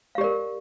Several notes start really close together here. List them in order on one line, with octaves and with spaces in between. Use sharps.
F5 G4 D5 A#4